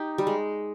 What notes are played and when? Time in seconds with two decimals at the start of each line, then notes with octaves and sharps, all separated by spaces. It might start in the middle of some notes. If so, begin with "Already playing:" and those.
Already playing: D#4 G4
0.18 G3
0.27 G#3